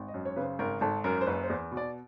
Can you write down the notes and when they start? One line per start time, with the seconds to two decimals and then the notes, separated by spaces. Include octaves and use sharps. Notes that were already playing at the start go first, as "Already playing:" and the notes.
Already playing: G#1
0.08 D#5
0.14 F#2
0.25 C#5
0.36 C#3 B4
0.42 C5
0.59 G#1 A#4
0.81 G#1 A4
1.04 F#2 A#4
1.21 C5
1.27 F#1 B4
1.43 C5
1.50 E2
1.72 B2
1.77 D5